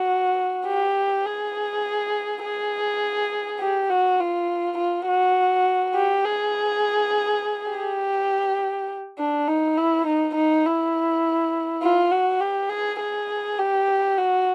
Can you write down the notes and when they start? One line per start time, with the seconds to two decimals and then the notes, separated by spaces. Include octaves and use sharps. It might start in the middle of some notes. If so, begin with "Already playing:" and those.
Already playing: F#4
0.66 G4
1.26 G#4
2.43 G#4
3.60 G4
3.90 F#4
4.20 F4
4.78 F4
5.08 F#4
5.95 G4
6.25 G#4
7.71 G4
9.19 D4
9.47 D#4
9.77 E4
10.07 D#4
10.35 D#4
10.65 E4
11.82 F4
12.12 F#4
12.41 G4
12.70 G#4
13.00 G#4
13.58 G4
14.18 F#4